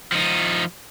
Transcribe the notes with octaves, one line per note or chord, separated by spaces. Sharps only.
F3 D#4